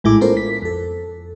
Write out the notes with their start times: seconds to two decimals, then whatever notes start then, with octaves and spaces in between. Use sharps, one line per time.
0.04 A#1 A2 G#3 E4 G#4 D6
0.21 B3 C#4 F4 A4 A#4 C5
0.37 B6
0.62 F2 A4